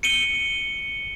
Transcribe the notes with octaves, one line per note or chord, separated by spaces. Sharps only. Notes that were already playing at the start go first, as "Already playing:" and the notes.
C#7 D#7 G7